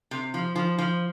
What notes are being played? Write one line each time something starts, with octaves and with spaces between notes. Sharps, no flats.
C3
F3
F3
F3